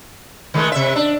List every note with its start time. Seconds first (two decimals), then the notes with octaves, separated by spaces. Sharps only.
0.54 D#3 G#3 A3
0.72 C3 E5
0.96 D4